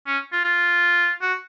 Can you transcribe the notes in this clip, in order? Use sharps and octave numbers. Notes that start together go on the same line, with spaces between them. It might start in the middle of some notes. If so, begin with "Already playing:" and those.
C#4
F4
F4
F#4